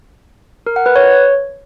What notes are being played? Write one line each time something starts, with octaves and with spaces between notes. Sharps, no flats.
A#4
F#5
B4
C#5